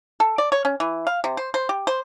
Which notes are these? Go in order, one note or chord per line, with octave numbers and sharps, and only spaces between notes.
A4
D5
C#5
C#4
E3
F5
C3
C5
C5
G4
C5